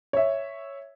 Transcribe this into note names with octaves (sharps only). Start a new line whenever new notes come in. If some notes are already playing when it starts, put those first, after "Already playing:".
C#5 E5